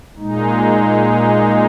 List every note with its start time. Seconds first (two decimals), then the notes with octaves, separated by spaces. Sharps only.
0.18 A#2 G#3 D#4